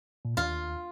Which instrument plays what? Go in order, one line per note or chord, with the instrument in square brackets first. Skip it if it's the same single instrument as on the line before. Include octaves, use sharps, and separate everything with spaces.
[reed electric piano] A#2
[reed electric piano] D#2 [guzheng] F4